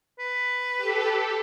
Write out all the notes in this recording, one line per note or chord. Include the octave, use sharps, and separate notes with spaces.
B4
G4 A4